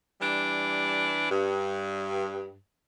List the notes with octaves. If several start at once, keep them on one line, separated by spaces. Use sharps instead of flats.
E3 G3 D4
G2